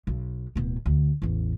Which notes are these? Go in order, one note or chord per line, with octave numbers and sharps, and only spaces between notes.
B1
D1 B2
D2
A1 E2